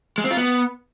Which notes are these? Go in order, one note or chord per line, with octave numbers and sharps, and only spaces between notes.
G#3
C4
F4
B3